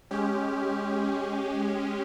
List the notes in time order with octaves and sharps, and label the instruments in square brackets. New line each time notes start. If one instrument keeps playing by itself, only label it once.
[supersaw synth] G#3 C#4 G4